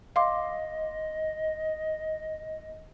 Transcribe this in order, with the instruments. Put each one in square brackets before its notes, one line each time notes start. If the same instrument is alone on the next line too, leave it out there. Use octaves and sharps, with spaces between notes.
[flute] D#5 [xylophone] F5 C6 D6